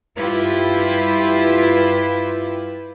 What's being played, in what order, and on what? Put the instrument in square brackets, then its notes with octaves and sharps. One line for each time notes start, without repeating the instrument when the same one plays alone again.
[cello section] G2 E4 F4 G4 B4